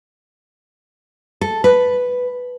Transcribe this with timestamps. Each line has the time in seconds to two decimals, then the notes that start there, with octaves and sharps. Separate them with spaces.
1.41 A4
1.64 B4